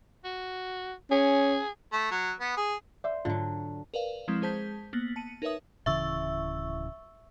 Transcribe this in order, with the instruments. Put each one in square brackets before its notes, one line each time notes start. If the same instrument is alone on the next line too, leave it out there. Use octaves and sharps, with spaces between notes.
[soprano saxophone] F#4
[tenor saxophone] C#4 [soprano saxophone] G#4
[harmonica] A3
F#3
B3
G#4
[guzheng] C5 [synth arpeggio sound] D5 E5
[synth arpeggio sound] G#2 F4 [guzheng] D3 F#3
[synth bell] A#4 B4 D5 F5
F3 G#3 C4 E4
G#3 G#4 C5 A5 G6 B6
A#3 B3 A6 B6 F#7
A5 C#7 D#7
D#4 A#4 B4 C#5 E5 D#6
[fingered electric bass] D1 C#3 E3 [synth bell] E5 C#6 E6